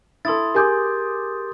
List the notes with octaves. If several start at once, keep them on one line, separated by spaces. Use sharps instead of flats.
E4 A4 C6 D#6 A6
G4 G#4 A#4 G#5 D6 G6